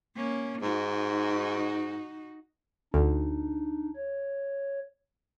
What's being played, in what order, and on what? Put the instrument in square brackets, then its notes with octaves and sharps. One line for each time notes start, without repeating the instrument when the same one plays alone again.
[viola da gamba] A#3 C#4
[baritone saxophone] G#2 [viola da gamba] D#4 F#4
[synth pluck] D2 [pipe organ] D4 D#4
[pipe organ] C#5